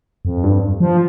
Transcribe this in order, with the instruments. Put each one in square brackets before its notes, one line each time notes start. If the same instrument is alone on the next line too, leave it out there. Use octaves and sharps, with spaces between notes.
[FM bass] F2
G2
F3